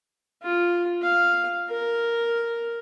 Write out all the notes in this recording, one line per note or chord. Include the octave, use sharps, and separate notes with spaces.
F4
F5
A#4